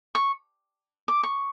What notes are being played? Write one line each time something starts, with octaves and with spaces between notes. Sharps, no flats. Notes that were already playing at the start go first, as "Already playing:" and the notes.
C#6
D6
C#6